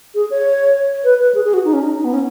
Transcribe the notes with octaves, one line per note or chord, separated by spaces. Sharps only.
G#4
C#5
B4
B4
G#4
G#4
F#4
D#4
C#4
D#4
D#4
B3
C#4